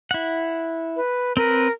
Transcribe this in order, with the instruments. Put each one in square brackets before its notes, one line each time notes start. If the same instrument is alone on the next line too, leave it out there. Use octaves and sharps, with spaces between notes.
[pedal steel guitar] E4 F#5
[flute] B4
[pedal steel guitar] C4 B4 [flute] A#4